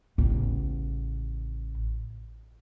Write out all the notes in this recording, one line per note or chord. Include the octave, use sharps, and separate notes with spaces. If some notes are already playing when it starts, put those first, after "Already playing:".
A1 C#3